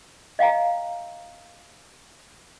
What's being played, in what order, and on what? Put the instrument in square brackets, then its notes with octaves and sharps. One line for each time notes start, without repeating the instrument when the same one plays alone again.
[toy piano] D#5 F5 G5 A#5